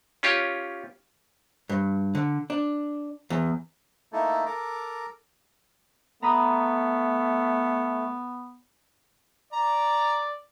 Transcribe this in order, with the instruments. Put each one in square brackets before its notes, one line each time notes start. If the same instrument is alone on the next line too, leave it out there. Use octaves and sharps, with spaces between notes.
[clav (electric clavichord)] C#4 F4 G4 C#5
[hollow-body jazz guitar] G2
D3
D4
E2
[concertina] A3 A#3 D#4 E4 A4
A4 A#4 A#5 D6
[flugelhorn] A3 [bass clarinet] B3 [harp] A#5 B5 D#6
[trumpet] D5 [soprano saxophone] A#5